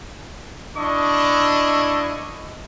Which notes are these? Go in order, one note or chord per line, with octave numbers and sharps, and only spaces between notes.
D4 E4 D#5 C#6